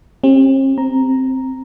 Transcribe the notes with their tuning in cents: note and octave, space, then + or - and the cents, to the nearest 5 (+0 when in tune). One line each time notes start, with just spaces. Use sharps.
C4 +45 G4 +15
C4 +0 A#5 +0